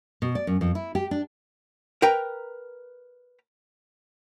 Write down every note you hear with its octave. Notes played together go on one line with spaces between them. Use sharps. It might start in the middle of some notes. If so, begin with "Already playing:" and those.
B2
D5
F#2
F2
E4
G4
D4
A#4 B4 G5 A#5